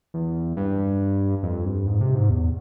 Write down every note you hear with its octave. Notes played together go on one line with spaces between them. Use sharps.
E2
G2
F2
G2
G#2
C3
G#2
E2